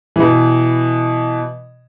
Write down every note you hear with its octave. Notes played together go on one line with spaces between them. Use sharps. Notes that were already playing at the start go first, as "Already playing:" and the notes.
B2 E3